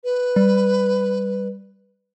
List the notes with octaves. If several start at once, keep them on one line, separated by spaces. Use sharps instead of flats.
B4
G3